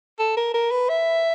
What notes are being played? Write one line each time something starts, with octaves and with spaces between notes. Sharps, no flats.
A4
A#4
A#4
B4
E5